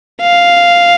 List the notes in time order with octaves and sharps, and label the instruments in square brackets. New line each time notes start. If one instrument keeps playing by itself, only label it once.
[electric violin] F5